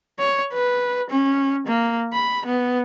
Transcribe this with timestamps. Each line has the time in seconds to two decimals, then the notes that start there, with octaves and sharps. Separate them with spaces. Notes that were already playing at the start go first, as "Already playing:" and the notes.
0.19 C#5
0.53 B4
1.10 C#4
1.67 A#3
2.13 B5
2.46 B3